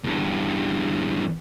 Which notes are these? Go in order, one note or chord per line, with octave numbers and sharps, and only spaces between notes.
E2 G2